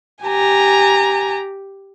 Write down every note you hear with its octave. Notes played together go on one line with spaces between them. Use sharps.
G4 G#5 A#5